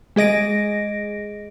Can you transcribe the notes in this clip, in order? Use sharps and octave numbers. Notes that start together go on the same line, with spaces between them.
G#3 G#4 D#5 A#6 D7